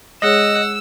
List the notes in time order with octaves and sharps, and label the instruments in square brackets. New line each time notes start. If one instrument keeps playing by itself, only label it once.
[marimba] G#3 G#4 C#5 [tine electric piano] D#5 [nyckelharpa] F#5 [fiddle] E6